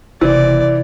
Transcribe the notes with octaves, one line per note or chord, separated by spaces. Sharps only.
F#1 C3 E3 D5